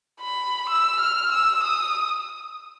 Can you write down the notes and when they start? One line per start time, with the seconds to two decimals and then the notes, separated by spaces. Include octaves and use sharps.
0.21 B5
0.69 E6
1.00 F6
1.31 E6
1.63 D#6